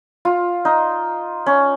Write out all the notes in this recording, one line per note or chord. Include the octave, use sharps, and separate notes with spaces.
F4
D#4
C#4